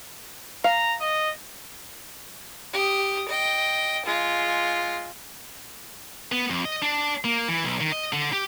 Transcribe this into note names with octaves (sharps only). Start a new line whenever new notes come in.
F5 A#5
D#5
G4 D#6
D#5 G5
G#3 F4
B3
F2
D#5
D4
A#3
E3
B1
D#3
D#5
D3
G4